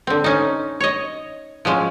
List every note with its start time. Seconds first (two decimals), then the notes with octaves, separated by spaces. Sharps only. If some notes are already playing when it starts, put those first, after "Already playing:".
0.07 D3 C4
0.24 C#4 D#4
0.80 C#5 D#5
1.65 F3 F#3 G#3 C#4